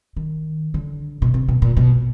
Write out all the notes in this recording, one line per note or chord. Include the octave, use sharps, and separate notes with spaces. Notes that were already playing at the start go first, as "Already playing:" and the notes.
D#3
D3
B2
C3
B2
A#2
B2